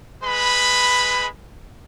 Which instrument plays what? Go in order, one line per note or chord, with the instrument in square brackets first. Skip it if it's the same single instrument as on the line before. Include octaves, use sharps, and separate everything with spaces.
[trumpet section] G#3 B4 B5